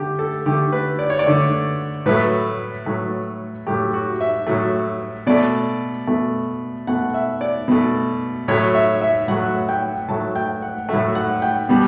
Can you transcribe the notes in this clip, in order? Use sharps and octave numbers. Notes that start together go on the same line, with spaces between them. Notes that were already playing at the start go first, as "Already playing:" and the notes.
Already playing: D3 A3 G4
A4
D3 A3 G4
B4
D5
C#5
D5
D3 A3
A2 F#3 A3 B4
A2 F#3 A3
A2 F#3 A3 G4
F#4
E5
A2 F#3 A3
B2 A3 D5
B2 A3
B2 A3 F#5
E5
D5
B2 A3
A2 F#3 A3 C#5
E5
E5
A2 F#3 A3 F#5
G5
A2 F#3 A3 A5
G5
F#5
A2 F#3 A3 E5
F#5
G5
B2 G3